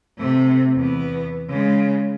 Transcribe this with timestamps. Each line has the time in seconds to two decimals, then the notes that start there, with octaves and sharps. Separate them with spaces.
0.18 C3 A3
0.75 E2 B3
1.49 C#3 G#3